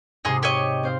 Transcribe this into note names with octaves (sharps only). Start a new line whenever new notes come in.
G#2 C3 D#4 G#4 C6
G4 C#5 D#5
C4 C5 F5